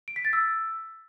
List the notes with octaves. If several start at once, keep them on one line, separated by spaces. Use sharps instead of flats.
D7
B6
A6
E6